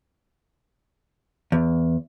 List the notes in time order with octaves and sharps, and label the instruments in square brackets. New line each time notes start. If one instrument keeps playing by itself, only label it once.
[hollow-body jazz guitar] E2